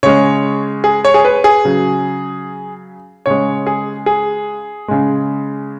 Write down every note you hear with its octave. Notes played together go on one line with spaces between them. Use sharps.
C#3 G#3 C#5
G#4
C#5
G#4
B4
G#4
C#3 F#3
C#3 G#3 C#5
G#4
G#4
C#3 G#3